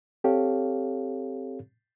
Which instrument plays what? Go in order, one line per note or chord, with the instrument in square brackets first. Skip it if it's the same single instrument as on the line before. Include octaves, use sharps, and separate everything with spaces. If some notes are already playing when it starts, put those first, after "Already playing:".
[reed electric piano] C4 G4 A4 C#5 F5